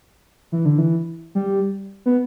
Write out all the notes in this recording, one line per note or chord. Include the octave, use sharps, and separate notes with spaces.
E3
D3
E3
G3
B3